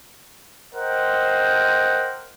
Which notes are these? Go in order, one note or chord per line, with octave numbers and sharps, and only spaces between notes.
A#4 C5 D#5 F#5 G5